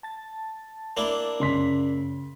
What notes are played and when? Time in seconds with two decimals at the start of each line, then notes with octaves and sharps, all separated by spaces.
0.03 A5 A6
0.97 A#3 D4 E4
1.40 F#2 C#3 C#4 C6 B6